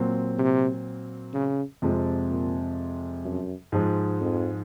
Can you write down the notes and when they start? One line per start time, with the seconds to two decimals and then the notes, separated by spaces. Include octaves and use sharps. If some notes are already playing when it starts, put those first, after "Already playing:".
Already playing: A#2 F#3 C4
0.39 C3
1.34 C#3
1.82 F2 C3 F3 G#3
2.29 A#2
3.25 F#2
3.72 G#2 F3 G#3
4.21 F2